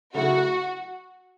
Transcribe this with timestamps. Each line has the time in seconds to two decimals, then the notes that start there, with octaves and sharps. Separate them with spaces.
0.14 C#3 F#3 A3 E4 F#4